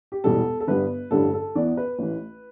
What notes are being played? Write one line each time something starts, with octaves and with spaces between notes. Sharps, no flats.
G4
E1 E2 B2 G3 A4
A4
G1 G2 G3 B3 B4
A1 G2 D3 G3 A4
A4
E2 E3 B3 D5
B4
A1 A2 E3